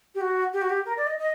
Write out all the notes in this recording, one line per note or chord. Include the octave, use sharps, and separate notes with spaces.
G4
F#4
G4
F#4
G4
A#4
D5
D#5
D#5